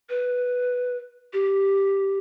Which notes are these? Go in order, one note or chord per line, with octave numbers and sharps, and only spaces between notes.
B4
G4